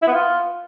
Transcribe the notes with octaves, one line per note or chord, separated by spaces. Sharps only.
E4
B3
F4